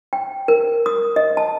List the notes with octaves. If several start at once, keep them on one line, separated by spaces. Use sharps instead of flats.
G5
A#4
D#6
D#5
A5